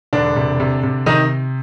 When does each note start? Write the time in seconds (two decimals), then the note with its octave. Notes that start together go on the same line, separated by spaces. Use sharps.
0.13 E1 D3 D4
0.36 C3
0.60 C3
0.83 C3
1.06 C3 D#3 D#4